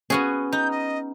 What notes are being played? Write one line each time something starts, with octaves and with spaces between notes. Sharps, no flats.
B3 C#4 F#4 G#4
D#4 G6
D#5